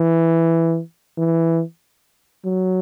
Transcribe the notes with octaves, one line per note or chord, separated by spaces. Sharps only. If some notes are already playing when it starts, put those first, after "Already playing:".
Already playing: E3
E3
F#3